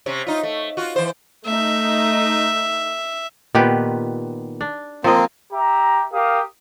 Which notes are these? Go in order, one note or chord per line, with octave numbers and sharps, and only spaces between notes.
C3 C#4
D#4 F4
A3
F4 F#4
E3 C5
A3 D#4 E5
A#2 D#3 B3 G4 B4
D4
F3 A#3 C4 C5 D#5
G4 E5 A#5
G4 A#4 F5 D#6